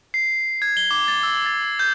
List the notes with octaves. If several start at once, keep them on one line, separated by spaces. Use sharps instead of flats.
C7
G#6
G7
D6
A6
E6
A6
G6